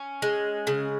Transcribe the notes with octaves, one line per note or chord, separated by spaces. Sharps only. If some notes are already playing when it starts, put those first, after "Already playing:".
Already playing: C#4
G#3
C#3